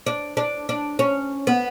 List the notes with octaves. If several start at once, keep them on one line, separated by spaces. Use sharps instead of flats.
D4
D4
D4
C#4
B3